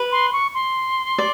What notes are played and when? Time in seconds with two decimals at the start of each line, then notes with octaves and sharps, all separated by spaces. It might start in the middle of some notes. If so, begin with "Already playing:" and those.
Already playing: B4
0.12 C6
0.33 C#6
0.54 C6
1.18 D5